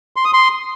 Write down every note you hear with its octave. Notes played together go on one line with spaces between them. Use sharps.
C6
D#6
C6